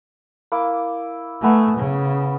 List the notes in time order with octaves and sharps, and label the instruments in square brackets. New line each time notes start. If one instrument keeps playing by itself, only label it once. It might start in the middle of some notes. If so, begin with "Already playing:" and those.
[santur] A#3 E4 D6
[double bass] A3 [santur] B3 G#5 A#5
[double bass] C#3